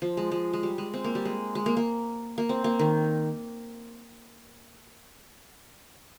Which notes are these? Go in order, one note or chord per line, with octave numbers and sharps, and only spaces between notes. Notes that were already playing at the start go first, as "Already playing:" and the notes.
F3
G#3
G#3
G#3
G3
G#3
C4
A#3
G3
G#3
G#3
A#3
A#3
A#3
C4
A#3
D#3